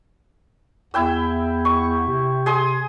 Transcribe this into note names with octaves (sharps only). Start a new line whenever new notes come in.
E2 E4 G5 E6
C#6
C3
G#4 C6 D#6